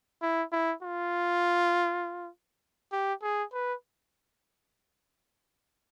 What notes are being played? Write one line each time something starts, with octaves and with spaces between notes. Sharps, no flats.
E4
E4
F4
G4
G#4
B4